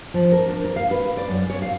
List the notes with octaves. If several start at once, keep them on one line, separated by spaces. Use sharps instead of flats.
F3
A#4
D4
A#4
F5
B4
D5
F#2
C#5
F5